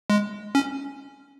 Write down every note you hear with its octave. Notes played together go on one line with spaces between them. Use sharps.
G#3
C#4